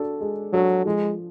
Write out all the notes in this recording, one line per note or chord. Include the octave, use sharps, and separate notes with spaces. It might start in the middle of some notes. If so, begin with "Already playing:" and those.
Already playing: D4 F#4 A4
G#3
F#3 D4 F#4 A4
F3 G#3